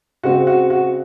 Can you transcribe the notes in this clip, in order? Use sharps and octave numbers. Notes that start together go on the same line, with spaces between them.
C#3 G#3 C4 F#4
F#4
F#4